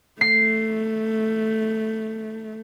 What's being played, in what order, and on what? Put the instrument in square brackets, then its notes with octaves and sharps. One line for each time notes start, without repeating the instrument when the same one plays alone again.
[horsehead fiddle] A3 [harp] C7